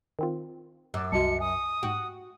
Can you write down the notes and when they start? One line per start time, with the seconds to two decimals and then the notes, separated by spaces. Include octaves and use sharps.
0.19 D#3 C4 F4
0.94 F#2 D6 E6
1.12 C2 F#4 D#5 A5 C#7
1.40 G#5 D#6
1.83 G#2 F#4 G5 D#7